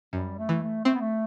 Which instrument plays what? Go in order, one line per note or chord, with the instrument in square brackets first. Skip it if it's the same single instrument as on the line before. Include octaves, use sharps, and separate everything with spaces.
[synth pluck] F#2 [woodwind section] G3
[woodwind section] A3
[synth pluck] E3
[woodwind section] A3
[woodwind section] A3 [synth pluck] C4
[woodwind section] B3
A3